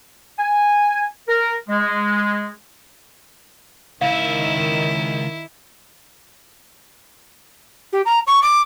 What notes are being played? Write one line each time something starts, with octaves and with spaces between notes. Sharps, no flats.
G#5
A#4
G#3
C#2 D#3 E4 E5 F5
G4
A#5
C#6
D6